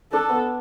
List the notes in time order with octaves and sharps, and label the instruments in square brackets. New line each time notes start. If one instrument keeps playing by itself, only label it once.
[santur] D4 [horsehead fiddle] A4
[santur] B3